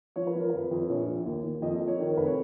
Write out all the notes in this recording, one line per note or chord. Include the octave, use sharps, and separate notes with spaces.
F3 C#5
B4
F3 A#4
F2 B4
F2
B4
A#1 C#5
F3
D#2
D#2
F2 D#5
D#5
F2
C#5
D#3 C#5
A#4
F1 B4
C#5